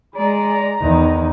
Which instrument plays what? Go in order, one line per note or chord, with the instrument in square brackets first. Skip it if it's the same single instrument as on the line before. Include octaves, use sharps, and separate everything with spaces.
[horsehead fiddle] G#3 D5 [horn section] A#5
[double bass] E2 D#3 [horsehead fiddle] D#4